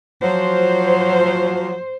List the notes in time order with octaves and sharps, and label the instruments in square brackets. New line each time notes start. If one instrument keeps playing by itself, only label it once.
[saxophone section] F3 F#3 [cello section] C5